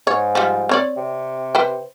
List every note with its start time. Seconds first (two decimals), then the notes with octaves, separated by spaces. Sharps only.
0.07 G#2 C#5
0.35 F3 G3
0.69 C4 C#5 D5
0.97 C3
1.55 B4 C5 G5